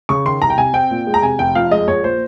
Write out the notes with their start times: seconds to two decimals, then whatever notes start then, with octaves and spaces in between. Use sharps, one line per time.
0.09 C#3 C#6
0.25 D#3 C6
0.42 C2 A#5
0.50 G5
0.57 C3 G#5
0.74 C4 G5
0.91 A#2
1.07 G#3
1.14 A#5
1.22 C3 G#5
1.39 F1 G5
1.55 F2 F5
1.71 G#3 D#5
1.87 A#1 C#5
2.04 A#2 C5